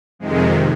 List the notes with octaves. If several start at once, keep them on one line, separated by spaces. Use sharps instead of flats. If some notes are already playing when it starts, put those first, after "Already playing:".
F2 C3 D#3 G#3